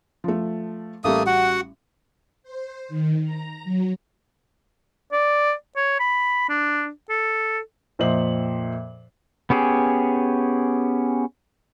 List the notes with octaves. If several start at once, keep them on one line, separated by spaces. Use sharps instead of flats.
F3 A3
A1 G3 A3 A#3 D#6
F#4 F#5
C5
D#3
A#5
F#3
D5
C#5
B5
D4
A4
F2 A#2 C5 D#5 E5 F#7
B3 C#4 G4 G#4